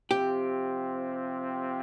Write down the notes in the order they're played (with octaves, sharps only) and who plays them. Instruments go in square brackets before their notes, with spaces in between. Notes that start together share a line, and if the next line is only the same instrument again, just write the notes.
[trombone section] C3 F3 C4 [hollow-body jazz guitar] G4